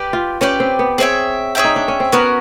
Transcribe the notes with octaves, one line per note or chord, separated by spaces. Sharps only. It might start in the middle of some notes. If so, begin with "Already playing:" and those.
Already playing: G4 B4 D5 G5
F4
C#4 G4 B4 D5 G5
C4
B3
C4 G#4 C#5 E5 G5
G#4 C#5 E5 G5
D#4
D4
C#4
C4
B3 C#4 F#4 A#4